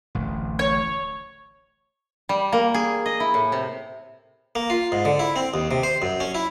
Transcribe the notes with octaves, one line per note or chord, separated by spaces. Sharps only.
D1 A1
C#5
G3
A#3
G#4
D#5
E4
A2
C3
A#3
F4
G#2
D3
E4
C4
D#2
C3
C5
F#2
C#4
E4